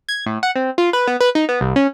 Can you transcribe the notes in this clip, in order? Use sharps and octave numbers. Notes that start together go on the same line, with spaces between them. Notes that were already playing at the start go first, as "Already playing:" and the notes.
G#6
A2
F#5
C4
F4
B4
B3
B4
D#4
B3
C2
C#4